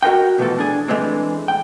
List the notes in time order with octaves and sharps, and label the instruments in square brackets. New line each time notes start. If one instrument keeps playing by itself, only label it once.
[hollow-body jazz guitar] F#4 A#4 C5 D#5 G5
B2 E3 F3 A3 A4
D4 G#4
E3 G#3 A3 C4 D4
G5